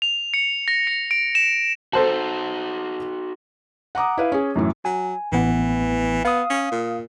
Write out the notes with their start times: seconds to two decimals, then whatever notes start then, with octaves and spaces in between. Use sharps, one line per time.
0.02 F7
0.34 C#7
0.68 A#6
0.87 C#7
1.11 D7
1.35 E7
1.93 D#4 F#4 A4 C5 A5
3.95 F#5 A#5 D6 D#6
4.17 E4 B4 F5
4.32 C#4 G#4
4.56 F#2 A2 E3
4.85 F#3 G#5
5.32 A1 E3 B3
6.25 B3 F5 D#6
6.50 C#4
6.71 A#2